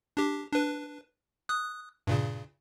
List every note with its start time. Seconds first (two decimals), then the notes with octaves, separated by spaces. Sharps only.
0.17 D4 G4
0.52 D4 B4
1.49 D#6 F#6
2.07 G2 A#2 C#3